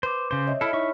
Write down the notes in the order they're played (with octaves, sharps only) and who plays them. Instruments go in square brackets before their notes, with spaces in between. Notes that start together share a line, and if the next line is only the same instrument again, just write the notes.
[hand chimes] B4 D6 [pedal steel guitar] C5
[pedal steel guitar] C#3 C5
[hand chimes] C#5 D#5 E5
[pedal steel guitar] E4 A4 [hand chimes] B5 F6
[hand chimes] D#4 E4 C#5 [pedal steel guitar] E5 C#6